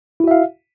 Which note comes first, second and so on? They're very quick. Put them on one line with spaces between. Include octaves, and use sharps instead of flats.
E4 F#4 E5 F5